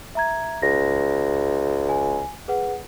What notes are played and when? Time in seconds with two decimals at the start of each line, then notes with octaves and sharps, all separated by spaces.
0.15 E5 A#5 G#6
0.62 C#2 A#6
1.89 G#5
2.48 G#4 B4 F#5